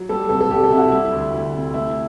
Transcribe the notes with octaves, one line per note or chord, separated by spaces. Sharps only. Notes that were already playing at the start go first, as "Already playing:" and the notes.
Already playing: F#3
G3 A4
C2 A4
A4
C2 G4
A4
C3 E4
F#4
G3 E4
D2
D2
C3
A3 E4